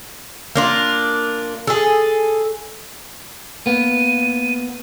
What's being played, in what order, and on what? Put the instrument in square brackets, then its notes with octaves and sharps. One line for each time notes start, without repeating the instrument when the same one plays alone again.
[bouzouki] A#3 D4 F4
G#4 A4
[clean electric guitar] A#3 B3 [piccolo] D#7